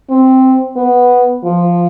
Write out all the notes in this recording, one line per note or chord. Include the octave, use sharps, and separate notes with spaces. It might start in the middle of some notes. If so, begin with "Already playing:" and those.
C4
B3
F3